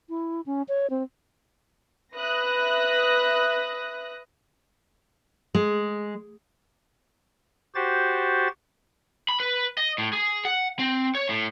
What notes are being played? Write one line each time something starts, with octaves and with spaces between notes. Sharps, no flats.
E4
C#4
C#5
C4
B4 E5 D#6 F#6 A#6
G#3
F#4 G4 C5 A6
B5
B4
D#5
A2
G#4
F#5
C4
C#5
A2